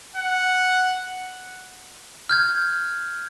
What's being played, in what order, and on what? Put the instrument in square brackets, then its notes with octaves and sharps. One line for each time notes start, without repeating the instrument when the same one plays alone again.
[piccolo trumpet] F#5
[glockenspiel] F6 G6 G#6